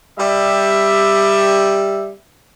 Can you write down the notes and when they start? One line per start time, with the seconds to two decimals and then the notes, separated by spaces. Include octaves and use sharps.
0.19 G3 E5